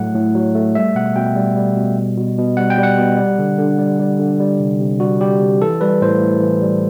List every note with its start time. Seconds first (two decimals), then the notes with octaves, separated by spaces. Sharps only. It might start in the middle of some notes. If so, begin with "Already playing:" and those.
Already playing: A2 F#3 A3 F#5
0.15 A2
0.35 F#3
0.55 A3
0.75 G3 E5
0.95 B2 F#5
1.16 B2 G5
1.36 G3
1.57 G3
1.76 B2
1.97 G3
2.17 B2
2.38 B2
2.57 G3 F#5
2.70 G5
2.78 G3
2.83 F#5
2.98 B2
3.18 G3
3.39 D3
3.58 D3
3.79 G3
4.00 G3
4.19 D3
4.40 G3
4.60 C3
4.80 C3
5.00 G3 F#4
5.21 G3 G4
5.41 C3
5.61 E3 A4
5.81 G3 B4
6.02 A2 C5
6.21 A2
6.42 E3
6.62 G3